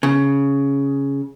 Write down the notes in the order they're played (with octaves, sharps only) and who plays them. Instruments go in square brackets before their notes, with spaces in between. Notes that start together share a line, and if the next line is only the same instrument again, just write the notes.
[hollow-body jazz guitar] C#3